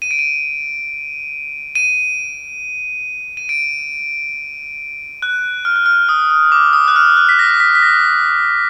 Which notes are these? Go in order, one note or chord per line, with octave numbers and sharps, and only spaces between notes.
D#7
D7
D#7
D#7
D#7
D7
F#6
F6
F#6
F6
D#6
D#6
D6
D#6
F#6
F6
F#6
B6
A#6
B6
B6
A#6